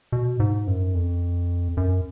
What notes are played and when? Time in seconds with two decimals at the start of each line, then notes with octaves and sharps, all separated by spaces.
0.12 B2
0.40 G#2
0.67 F#2
0.94 F2
1.77 F#2